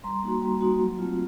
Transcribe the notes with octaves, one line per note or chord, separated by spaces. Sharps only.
G3 A#5 C6
A#3 D#4 F#4
G3
A#3 D#4 F#4
F#3
A3 C4 F4